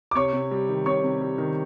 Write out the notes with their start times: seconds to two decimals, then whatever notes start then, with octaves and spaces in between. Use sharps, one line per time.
0.11 D6
0.15 C3 C#5 C#6
0.33 C3
0.51 G3
0.69 D#3
0.86 C3 C#5 C#6
1.03 C3
1.22 G3
1.38 D#3